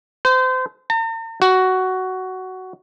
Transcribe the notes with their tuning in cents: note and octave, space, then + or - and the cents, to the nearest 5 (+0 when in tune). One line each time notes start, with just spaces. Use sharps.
C5 -30
A#5 -45
F#4 +10